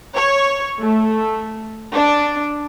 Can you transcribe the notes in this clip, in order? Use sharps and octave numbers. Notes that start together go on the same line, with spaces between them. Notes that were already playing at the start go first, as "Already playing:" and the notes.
C#5
A3
D4